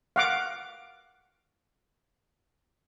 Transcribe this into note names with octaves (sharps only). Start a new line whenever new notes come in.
F5 F#5 D6